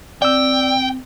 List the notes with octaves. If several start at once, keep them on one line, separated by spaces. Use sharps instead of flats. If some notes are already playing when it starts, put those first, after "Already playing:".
C4 D5 G5 E6